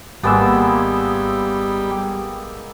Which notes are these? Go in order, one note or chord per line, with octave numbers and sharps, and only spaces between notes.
G#1 G3 G#3 A#3 B3 E6